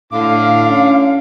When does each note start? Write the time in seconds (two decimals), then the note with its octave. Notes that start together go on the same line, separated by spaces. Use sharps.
0.12 A2 D3 F5 D6
0.68 C#4